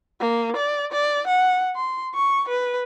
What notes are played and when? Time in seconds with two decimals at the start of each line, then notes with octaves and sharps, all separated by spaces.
0.21 A#3
0.56 D5
0.92 D5
1.27 F#5
1.76 C6
2.14 C#6
2.48 B4